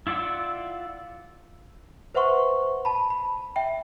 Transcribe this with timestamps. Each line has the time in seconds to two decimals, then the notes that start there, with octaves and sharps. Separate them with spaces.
0.07 E4 F4 D5 F#5 E6
2.15 B4 C5 E5 F#5 C6 C#6
2.85 A5 B5
3.10 B5
3.56 E5 G5